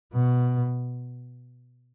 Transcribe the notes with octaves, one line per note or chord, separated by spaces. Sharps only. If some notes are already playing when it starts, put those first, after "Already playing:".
B2